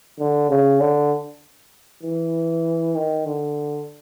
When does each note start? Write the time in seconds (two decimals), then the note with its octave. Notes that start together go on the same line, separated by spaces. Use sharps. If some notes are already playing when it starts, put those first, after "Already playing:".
0.19 D3
0.49 C#3
0.80 D3
2.03 E3
2.95 D#3
3.27 D3